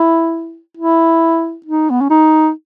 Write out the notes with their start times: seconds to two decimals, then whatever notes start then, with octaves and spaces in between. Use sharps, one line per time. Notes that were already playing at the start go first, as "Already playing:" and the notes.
Already playing: E4
0.77 E4
1.66 D#4
1.90 B3
2.01 C#4
2.10 D#4